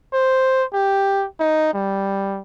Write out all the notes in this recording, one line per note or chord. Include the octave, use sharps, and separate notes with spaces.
C5
G4
D#4
G3